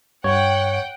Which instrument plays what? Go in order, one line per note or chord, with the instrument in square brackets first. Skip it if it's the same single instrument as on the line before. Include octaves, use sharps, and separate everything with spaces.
[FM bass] G2 [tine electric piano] C#5 [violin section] F#5 G5